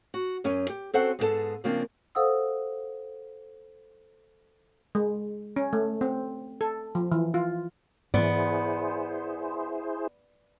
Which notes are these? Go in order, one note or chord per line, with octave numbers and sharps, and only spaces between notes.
F#4
F#2 C#4 G#5
G4
C4 C#4 F#4 A4 C5 F#5
G#2 G#3 B3 D#4 A4 A5
C#3 F3 A#3 C4 D4
A4 C5 F5 F#5 D#6 E6
G#3
C#4
A3
C4
A4
F3
E3
F4
G#2 E3 B3 E4 G#4 C5 D5